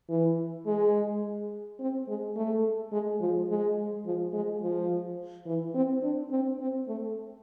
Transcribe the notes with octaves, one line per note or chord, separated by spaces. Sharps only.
E3
G#3
C4
G#3
A3
G#3
F3
G#3
F3
G#3
F3
E3
C4
D4
C4
C4
A3